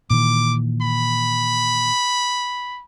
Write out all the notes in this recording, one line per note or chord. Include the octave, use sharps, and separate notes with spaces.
A#2 D#3 E3 D6
B5